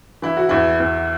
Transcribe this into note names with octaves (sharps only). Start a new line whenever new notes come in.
E3 E4
F#4
E2 E4
E2